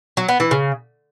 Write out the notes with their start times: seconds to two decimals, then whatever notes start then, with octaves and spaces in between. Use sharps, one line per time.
0.17 F#3
0.28 B3
0.40 E3
0.51 C#3